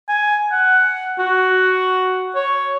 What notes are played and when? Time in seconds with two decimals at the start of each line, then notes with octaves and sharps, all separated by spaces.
0.09 G#5
0.52 F#5
1.19 F#4
2.35 C#5